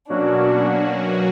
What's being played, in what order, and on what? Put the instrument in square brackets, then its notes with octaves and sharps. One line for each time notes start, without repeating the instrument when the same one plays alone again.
[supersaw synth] B2 F#3 A#3 C#4 F#4 [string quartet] D4